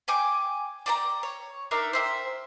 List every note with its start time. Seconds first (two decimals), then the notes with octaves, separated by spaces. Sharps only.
0.08 G5 G#5 D6 G6
0.86 D5 G5 A#5
1.23 C#5
1.71 D4 D#4 A#4 E5
1.93 C5 E5 G5